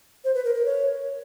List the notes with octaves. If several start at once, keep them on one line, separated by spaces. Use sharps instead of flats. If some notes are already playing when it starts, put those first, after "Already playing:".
C5
B4
A#4
A#4
C#5